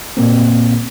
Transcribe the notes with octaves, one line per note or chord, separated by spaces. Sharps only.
A#2 A#3 C4